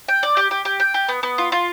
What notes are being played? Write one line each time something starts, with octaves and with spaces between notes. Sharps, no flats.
G5
D5
G4
G4
G4
G5
G4
B3
B3
F4
F4